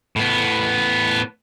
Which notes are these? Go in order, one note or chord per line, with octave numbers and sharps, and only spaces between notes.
A2 B3